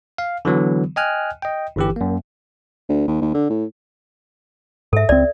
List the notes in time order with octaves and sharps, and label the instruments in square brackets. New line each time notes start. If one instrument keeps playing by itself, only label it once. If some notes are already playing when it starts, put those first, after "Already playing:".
[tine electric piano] F5
D3 E3 F#3 B3
D#5 G5 G#5 F6 F#6
D#5 G5
G1 E3 G4
F#2 A#3
[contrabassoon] D2
D#2
D#2
D3
A2
[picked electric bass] G#2 [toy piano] A4 E5
[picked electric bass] C#2 C4 [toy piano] D5